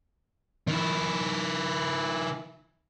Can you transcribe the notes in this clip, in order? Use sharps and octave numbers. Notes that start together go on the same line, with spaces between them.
D#3 E4